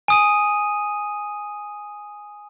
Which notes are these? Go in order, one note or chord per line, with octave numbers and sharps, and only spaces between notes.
G#5 D#6 D#7